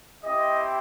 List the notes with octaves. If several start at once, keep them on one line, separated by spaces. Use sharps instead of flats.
C4 E4 G4 D#5